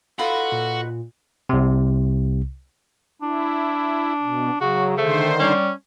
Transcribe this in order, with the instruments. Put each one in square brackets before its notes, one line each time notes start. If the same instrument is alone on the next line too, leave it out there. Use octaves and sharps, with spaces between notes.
[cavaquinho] D#4 F4 B4 [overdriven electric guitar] F#4 [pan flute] A4 [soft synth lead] B5
[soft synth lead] A#2
[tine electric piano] C2 C3
[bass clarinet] D4 [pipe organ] E4
[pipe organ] B2
[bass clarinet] C#3 [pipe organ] F#3 [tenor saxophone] F#4
[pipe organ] D3 D#3 C5 [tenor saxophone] A3
[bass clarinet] G3 [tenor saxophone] C#4